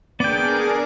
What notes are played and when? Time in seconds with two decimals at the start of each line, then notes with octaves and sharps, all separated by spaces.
0.20 B3 D4 G#4 A#4 D5 G5 D6